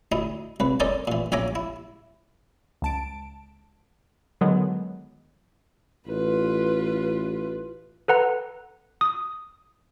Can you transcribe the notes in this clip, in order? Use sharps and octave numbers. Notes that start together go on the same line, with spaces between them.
D2 D#4 E4
C2 B4
C#4 D#4 A4 A#4 C5 D5
A#2 E3
A#1 C#4 E5 G#5 A#5 D6
E4
C#2 A5 D7
D3 D#3 F#3 G#3 B3
A1 F4 B4
A4 B4 F#5 A#5
D#6